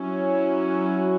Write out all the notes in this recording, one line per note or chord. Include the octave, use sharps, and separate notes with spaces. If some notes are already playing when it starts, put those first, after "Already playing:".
Already playing: F#3 C#4 E4
F#4